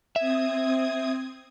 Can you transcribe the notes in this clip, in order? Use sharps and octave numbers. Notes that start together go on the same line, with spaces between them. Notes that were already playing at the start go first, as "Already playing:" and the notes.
C4 E5 D#6 G#6